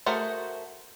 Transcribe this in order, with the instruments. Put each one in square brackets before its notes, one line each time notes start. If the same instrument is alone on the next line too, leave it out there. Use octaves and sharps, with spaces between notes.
[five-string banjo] A3 F#4 G#4 A#4 C5